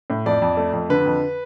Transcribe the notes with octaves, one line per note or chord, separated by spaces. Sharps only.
A2
F2 D5
F2
A3
F2
D3 B4
F2